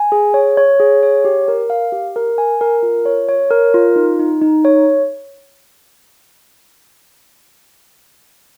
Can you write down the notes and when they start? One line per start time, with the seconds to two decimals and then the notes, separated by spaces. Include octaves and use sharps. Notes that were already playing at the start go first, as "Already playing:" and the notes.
Already playing: G#5
0.12 G#4
0.34 C#5
0.57 C#5
0.80 G#4
1.03 C#5
1.25 G4
1.48 A#4
1.70 F5
1.92 G4
2.16 A#4
2.38 G#5
2.61 A#4
2.83 F4
3.05 C#5
3.29 C#5
3.51 A#4
3.74 F4
3.96 D#4
4.19 D#4
4.42 D#4
4.65 C#5